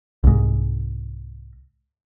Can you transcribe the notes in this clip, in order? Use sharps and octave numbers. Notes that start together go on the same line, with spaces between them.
C2 G#2